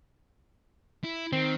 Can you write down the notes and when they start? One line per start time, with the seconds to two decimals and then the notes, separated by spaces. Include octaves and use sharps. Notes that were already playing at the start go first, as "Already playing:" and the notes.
1.04 E4
1.33 D#3 C4